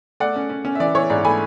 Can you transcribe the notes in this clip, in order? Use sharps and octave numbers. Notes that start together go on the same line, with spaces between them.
A3 D5 F#5
C#4
C#4
C#4
E5
E3 D5
E3 C#5
G#2 D5
A3 G#5 B5